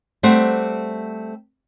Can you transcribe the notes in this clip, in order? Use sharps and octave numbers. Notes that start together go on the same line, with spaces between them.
G3 A3 C4 C5 F#5